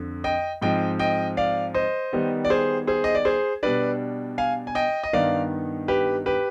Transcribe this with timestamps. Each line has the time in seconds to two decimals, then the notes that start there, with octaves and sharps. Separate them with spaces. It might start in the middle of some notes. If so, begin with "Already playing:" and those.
Already playing: F2 D3
0.24 D#5 G5
0.62 G#2 F3 C4 D#5 G5
0.99 D#5 G5
1.37 D5 F5
1.74 C5 D#5
2.12 D#3 G3 B3 D#4
2.45 D5
2.50 G#4 C5
2.87 G#4 C5
3.04 D#5
3.15 D5
3.25 G#4 C5
3.63 B2 G3 D4 B4 D5
4.38 F5 G#5
4.67 G#5
4.75 D#5 G5
5.04 D#5
5.13 G2 D#3 B3 D#4 D5 F5
5.88 G4 B4
6.26 G4 B4